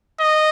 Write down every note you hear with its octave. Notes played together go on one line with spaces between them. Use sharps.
D#5